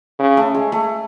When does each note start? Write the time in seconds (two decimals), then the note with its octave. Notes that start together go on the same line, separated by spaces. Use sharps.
0.19 C#3
0.37 A3
0.54 G#3
0.72 A3